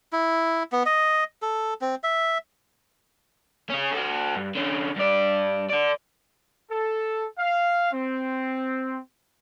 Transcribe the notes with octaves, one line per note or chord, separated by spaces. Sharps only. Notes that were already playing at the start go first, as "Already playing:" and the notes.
E4
B3
D#5
A4
C4
E5
C#4 G#4
F#4 A4
G2
D3 C#4
G2 D5
A4 D5
A4
F5
C4